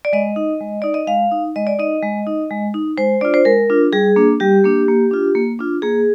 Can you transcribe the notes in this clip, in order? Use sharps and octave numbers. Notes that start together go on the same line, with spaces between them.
D5
G#3 D#5
D#4
G#3
D#4 D5
D#5
G#3 F5
D#4
G#3 D#5
D5
D#4 D#5
G#3
D#4
G#3
D#4
G#3 C5
D4 F4 D5
C5
G#3 A#4
D4 F4
G3 G#4
A#3 D4
G3 G4
A#3 D4
A#3
D4 F4
A#3
D4 F4
A#3 G#4